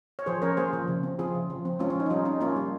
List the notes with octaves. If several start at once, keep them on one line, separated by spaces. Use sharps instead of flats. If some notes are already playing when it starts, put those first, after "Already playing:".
C#5
F3 G#4 C5
C#4 A#4 C#5
A#3 G#4 C5
F3
C#3
C4
F3 F4 G#4
C#3
F3
C4
G#3 C#4 F4
C#4
F3 D#4
D#4
G3 C#4 F4
C#4 D#4
A#3 C#4 F4
G3